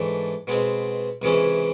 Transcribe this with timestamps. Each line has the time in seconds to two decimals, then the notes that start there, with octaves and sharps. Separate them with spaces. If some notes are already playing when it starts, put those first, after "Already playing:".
Already playing: G#2 E3 A3 D4
0.47 B2 G#3 C4
1.22 C#2 C3 E3 G#3 C#4